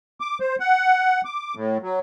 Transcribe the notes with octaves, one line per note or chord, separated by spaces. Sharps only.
D6
C5
F#5
D6
A2
F#3